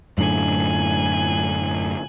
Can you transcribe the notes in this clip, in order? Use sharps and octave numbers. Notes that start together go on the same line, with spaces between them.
F#2 A2 D3 G#5 F#6